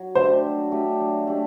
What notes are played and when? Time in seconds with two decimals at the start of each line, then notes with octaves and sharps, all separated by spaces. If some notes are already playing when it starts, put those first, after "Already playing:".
Already playing: F#3
0.15 A3 D4 G4 C5
0.44 F#3
0.72 A3 D4 G4
1.00 F#3
1.27 A3 D4 G4